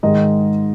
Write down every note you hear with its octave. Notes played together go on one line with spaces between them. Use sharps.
G#2 D#3 G#3 D#5